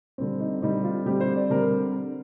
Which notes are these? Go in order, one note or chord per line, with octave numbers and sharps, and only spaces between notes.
D3 G3 C4
D#4
D3 G3 C4 D#4
F4
D3 G3 C4 G4
C5
D5
D3 G3 C4 A#4